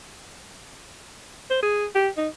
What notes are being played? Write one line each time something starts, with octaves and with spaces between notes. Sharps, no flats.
C5
G#4
G4
D#4